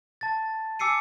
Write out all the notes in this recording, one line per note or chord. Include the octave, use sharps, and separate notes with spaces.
A5 A6
G#5 D6 E6 C7 C#7 D#7